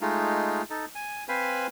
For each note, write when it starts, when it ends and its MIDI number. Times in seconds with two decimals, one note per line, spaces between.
0.01 0.62 56
0.01 0.62 57
0.01 0.62 63
0.01 0.62 65
0.70 0.85 63
0.70 0.85 69
0.95 1.24 80
1.29 1.67 60
1.29 1.67 71
1.29 1.67 72
1.29 1.67 77
1.29 1.67 80
1.29 1.67 83